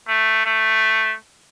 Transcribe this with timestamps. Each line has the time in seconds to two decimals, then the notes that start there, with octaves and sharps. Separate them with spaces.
0.08 A3
0.45 A3